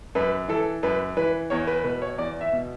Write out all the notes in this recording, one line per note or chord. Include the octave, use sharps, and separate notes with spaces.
F#2 B4
E3 A4
F#2 B4
E3 B4
E2 C#5
B4
B2 B4
C#5
E2 D5
E5
B2